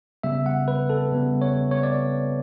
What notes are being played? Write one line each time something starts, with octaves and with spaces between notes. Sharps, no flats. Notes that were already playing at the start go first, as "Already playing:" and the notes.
C#3 G3 B3 E5
F#5
B4
A4
C#3 G3 B3
C#5
C#5
D5